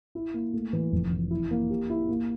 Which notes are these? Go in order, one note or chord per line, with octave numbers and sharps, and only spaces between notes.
E4
A#3
A3
E3
F1
E3
E4
A#3
G4
E4
A#3